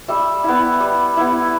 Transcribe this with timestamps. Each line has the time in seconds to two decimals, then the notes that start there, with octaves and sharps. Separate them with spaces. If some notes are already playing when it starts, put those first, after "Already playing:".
0.08 G3 E5
0.44 B3 E4
0.80 G3
1.17 B3 E4